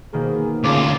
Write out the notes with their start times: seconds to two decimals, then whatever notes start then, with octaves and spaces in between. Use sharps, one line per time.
0.13 B2 D#3 A#3 G#4
0.64 D2 C#3 F4 D6